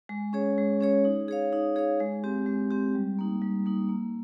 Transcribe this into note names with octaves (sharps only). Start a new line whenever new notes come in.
G#3
C#4 G#4 C#5
G#3
C#4 G#4 C#5
D#4
G#4 C#5 F5
D#4
G#4 C#5 F5
G#3
C4 G4
G#3
C4 G4
G3
A#3 D#4
G3
A#3 D#4
A#3